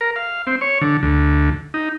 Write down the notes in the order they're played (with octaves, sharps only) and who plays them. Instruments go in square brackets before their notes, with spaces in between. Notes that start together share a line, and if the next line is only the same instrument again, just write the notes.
[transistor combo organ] A#4
F5
C4
C#5
D3
D2
D#4